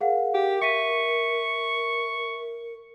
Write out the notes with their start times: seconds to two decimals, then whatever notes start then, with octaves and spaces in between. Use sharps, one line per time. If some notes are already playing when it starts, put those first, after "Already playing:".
0.01 G#4 A#4 F5 F#5
0.34 G4
0.62 E5 C#6 B6 D#7